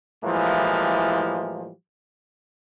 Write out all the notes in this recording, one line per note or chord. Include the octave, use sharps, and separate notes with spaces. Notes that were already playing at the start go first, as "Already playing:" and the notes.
A2 E3 F3 G3 G#3 A#3